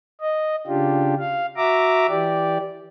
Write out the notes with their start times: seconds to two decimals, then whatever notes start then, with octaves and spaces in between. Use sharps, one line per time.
0.21 D#5
0.67 C#3 D4 F4 G4
1.19 F5
1.57 F#4 E5 A#5 D6
2.09 E3 G4 D5